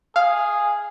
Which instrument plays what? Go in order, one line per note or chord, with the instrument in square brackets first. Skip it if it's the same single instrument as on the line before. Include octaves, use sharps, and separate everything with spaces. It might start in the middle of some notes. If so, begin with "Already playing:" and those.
[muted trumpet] G#4 [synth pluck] F5